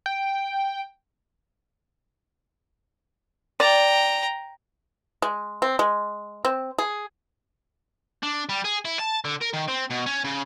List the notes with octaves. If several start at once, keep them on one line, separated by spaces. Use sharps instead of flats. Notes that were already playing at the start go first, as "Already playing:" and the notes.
G5
D5 G5 A#5
G#3
C4
G#3
C4
G#4
D4
G3
G#4
E4
A5
D3
A#4
D#3
C4
B2
C#4
C#3